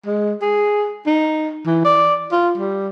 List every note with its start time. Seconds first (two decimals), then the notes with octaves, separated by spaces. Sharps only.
0.06 G#3
0.42 G#4
1.07 D#4
1.66 E3
1.85 D5
2.32 F4
2.58 G3